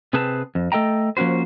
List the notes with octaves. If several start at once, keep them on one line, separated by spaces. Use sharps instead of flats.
C3 C4 G#4 B4 C5 A5
F2
A3 A4 D#5 G5 A#5
F3 A#3 C#4 F#4 C5